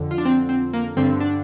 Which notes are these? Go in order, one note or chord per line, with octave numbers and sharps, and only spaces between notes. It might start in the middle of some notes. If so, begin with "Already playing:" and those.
Already playing: F2 D3
F4
D4
C4
C4
A#3
G2 D3 C4
D4